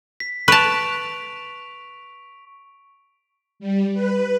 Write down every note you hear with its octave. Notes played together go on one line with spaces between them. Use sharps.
B6
B4 A5 C#6 D7 F7
G3
B4